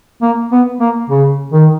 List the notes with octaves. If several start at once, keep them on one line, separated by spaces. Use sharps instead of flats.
A#3
B3
A#3
C#3
D#3